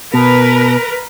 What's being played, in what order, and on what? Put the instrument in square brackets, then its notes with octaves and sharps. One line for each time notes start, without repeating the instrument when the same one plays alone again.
[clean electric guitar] B2 [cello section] A#4 B4